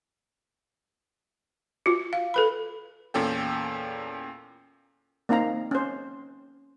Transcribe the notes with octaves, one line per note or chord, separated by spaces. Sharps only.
F4 F#4
F5
A4 B4 B5
E2 A#2 C#4 A4 G5
A#3 C4 D#4 F5 A#5
C#4 C5